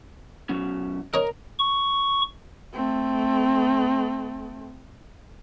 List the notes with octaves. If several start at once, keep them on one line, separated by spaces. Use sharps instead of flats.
B2 F#3 C#4
A#4 C#5 D#5 A#5
C#6
A3 C4